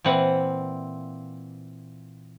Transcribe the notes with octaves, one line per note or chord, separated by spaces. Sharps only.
A#2 E3 C4 F#5